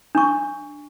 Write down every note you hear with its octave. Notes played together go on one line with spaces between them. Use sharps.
D4 C#6